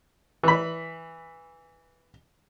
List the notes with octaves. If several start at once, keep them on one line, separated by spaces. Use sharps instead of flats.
E3 B5